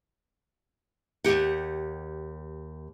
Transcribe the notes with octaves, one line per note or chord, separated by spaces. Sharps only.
D#2 D#3 G4 F#5